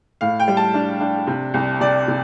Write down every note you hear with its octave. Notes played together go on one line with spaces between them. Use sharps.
A2 F5
G5
G3
A5
D4
D4
C3
C2
C3 D5
C3